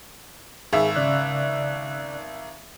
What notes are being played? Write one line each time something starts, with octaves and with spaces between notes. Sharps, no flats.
G#1 G#4 E5
C#3 D5 F#6